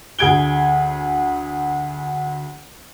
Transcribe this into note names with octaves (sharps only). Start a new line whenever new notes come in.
D2 G#4 G#6 D7 G7